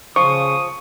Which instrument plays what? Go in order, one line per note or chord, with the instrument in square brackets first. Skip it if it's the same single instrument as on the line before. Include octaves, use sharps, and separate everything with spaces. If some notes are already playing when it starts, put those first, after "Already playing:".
[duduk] C#3 [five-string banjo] F3 [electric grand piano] C#6 [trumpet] D#6